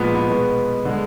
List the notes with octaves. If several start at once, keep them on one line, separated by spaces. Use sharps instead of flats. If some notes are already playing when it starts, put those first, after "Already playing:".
Already playing: A#2 F3 G#3 B3
B3
B2 G#3
D3 G#3